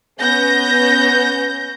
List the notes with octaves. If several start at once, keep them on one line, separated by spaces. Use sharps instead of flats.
B3 C#4 G6 A#6